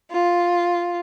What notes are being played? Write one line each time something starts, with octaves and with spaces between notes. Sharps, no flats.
F4